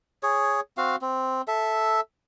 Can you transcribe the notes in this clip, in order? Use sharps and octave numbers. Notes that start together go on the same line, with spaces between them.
G#4 C#5
C4 F#4 F5
C4
A4 E5